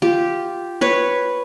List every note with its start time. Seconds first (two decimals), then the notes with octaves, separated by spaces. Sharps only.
0.02 F4 G4
0.81 B4 C#5